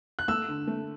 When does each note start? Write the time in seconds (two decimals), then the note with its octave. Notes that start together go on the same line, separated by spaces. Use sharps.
0.19 F#6
0.28 A3 E6
0.49 D3
0.67 A3